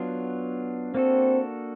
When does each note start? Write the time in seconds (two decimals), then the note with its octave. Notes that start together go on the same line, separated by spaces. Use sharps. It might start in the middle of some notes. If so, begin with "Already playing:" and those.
Already playing: F#3 B3 D4 F4
0.94 A#3 C4 D4 F#4 A4